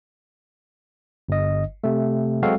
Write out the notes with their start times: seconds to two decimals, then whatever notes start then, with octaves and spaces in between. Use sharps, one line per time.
1.29 G1 D#5
1.84 C3 A3
2.42 F#3 G#3 C4 F#4 A4 F5